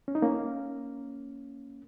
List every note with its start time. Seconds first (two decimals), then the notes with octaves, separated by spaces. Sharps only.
0.08 C#4
0.15 D#4
0.22 A#3 C#4